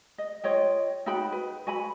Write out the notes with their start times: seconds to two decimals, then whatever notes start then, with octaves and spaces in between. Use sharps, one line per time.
0.18 D#5
0.44 F4 C#5 D#5 G5
1.06 D#4 F#4 G5 B5
1.32 B4
1.67 F#4 G#5 B5